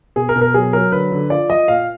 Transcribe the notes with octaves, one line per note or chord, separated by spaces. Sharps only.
B2 G#4
A#4
B2
A#4
F#3 G#4
F#3 A#4
D3 B4
D3
F3 D5
F3 D#5
A#2 F5